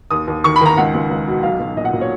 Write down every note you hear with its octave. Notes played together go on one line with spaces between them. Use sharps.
D#2 D#6
D#2
D#3 C#6
B5
D#3 A#5
C#2 F#5
C#2
C#2
B2
B1 F5
B1
A#2 D#5
F#5
A#2
C#5